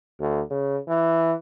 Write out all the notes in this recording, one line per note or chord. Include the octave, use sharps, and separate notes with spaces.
D2
C#3
E3